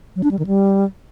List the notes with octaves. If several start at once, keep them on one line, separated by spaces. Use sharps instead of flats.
F#3
D4
G3
D#3
G3